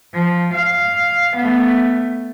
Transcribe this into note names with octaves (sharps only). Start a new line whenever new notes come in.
F3
F5
A3 B3